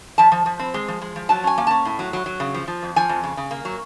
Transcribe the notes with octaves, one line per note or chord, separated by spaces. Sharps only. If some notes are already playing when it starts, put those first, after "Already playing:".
F3 A5
F3
F3
C4
G#3
F3
G#3
F3
F#3 A5
C#4 G#5
A#3
C#4 A5
A2
F#3
F#3
F#3
C#3
F3
F3
F2
F3 G#5
F2
C#3
C#3
A#3
F#3